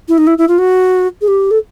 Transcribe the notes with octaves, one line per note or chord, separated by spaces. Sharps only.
E4
D#4
E4
E4
F4
F#4
G#4
G4
A4